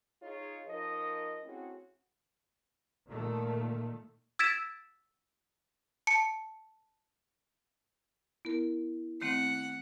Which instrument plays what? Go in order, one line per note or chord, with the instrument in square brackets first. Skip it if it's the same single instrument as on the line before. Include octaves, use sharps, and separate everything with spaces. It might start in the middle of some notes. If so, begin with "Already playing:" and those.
[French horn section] D#4 F4 G#4 C#5
F3 D#4 A#4 D#5
A3 C4 C#4 E4 F#4 G#4
[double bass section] A#2 D#3 A3
[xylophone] E6 G#6 A6 B6 D7 E7
A5 C#7
[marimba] B3 A#4 [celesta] E4
[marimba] D#3 A3 C4 [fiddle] F#5